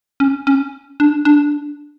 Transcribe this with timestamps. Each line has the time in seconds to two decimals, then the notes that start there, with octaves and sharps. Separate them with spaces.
0.20 C#4
0.47 C#4
1.00 D4
1.25 D4